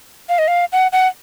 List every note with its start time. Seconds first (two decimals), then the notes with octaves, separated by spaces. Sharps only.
0.29 F5
0.39 D#5
0.48 F5
0.72 F#5
0.93 F#5